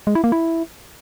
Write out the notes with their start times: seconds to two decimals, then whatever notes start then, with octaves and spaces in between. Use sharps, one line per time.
0.07 G#3
0.15 E4
0.24 A#3
0.32 E4